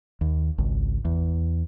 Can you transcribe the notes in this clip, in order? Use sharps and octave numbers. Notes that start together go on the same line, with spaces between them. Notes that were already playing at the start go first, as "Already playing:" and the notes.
D#2
G#1 C#2
E2